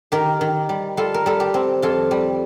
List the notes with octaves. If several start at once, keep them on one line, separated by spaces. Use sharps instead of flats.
D#3 G4 A#4
D#3
G3
G3 F4 A4
A#4
G3 A4
G4
C4
F2 F4 A4
G3